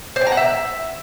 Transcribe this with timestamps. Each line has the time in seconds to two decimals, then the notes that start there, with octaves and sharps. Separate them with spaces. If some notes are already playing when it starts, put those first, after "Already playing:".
0.16 C5
0.21 G5
0.27 A#5
0.32 F#5
0.37 E5